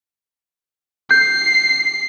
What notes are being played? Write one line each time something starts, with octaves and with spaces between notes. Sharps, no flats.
G6 C7